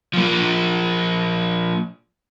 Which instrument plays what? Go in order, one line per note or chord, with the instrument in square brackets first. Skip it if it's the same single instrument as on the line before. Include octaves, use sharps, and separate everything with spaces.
[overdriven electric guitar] F3 A#3